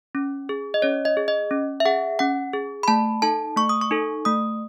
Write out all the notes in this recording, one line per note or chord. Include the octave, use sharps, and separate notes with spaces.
C#4
G#4
D#5
C#4 C#5
D#5
G#4
D#5
C#4
E5
G#4 F#5
C#4 F#5
G#4
B5
A3 A5
D#4 A4 A5
A3 C#6
D#6
C#6
D#4 A4
A3 D#6